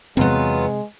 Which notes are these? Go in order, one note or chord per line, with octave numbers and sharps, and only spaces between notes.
E2 C3 F#3 G#3 B3 C4 F4